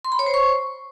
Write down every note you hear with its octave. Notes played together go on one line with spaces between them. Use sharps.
C6
B5
C#5
C5
C#6